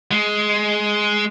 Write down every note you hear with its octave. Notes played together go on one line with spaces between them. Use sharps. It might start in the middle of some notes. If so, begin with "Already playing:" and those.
G#3